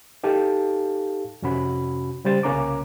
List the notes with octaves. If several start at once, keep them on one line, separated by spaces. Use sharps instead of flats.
D#4 G4 A4 F5 A5
F2 C3 C#4 F#4 B5
C#3 G3 C5 A6
C2 C#3 A#3 C#4 A#5 D6